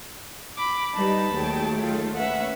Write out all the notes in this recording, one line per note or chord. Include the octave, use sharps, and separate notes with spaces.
B5 D6
G3 D#4 G4 B4 A5 B5
D#2 F#3 A3 G#4 G5
F4 A4
C#4 B4 E5 F#5